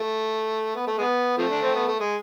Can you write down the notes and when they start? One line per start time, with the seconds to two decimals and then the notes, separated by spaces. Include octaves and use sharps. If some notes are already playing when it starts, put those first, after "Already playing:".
Already playing: A3
0.75 B3
0.87 A3
0.98 G#3 B3
1.38 C3 F3 A3
1.50 D4
1.62 C4
1.75 B3
1.87 A3
2.00 G#3